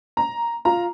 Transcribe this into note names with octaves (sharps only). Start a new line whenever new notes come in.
A#5
F4 A#5